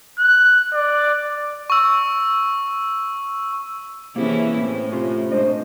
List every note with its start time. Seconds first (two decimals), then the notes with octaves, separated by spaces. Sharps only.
0.19 F#6
0.73 D5
1.70 C#6 E6
4.16 C3 E3 A#3 C#4 E4 G#4
4.59 A2 C4
4.92 C3 C#4 F4
5.32 G#3 D4 C5 D#5